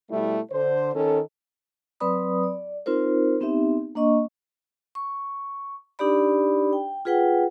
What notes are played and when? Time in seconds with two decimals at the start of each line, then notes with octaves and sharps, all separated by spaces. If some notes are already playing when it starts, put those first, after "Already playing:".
0.11 B2 G3 A3 E4
0.52 D3 C5
0.95 D#3 C#4 A4
2.00 F#3 C4 B4 D5 B5 D#6
2.43 D5
2.86 C4 D#4 F4 A#4 C5
3.41 B3 C4 D#4 G4 E5
3.95 A#3 D4 D#5 C#6
4.95 C#6
5.99 D4 D#4 G4 D5 B5
6.73 G5
7.05 F4 G#4 B4 F#5 G5